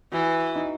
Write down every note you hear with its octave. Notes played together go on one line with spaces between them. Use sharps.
E3 F#4
D#4